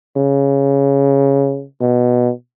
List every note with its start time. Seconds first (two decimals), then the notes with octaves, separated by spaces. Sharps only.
0.17 C#3
1.81 B2